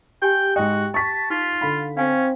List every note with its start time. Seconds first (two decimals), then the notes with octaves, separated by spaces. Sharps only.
0.22 G4 G5 G#5
0.56 G#2 F#4 D#5 G5
0.94 A5 C#6 B6
1.30 D#4 F4
1.61 D3 F5 B5
1.97 C4 C#4 F5 G#5